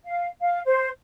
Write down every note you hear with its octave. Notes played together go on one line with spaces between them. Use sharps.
F5
F5
C5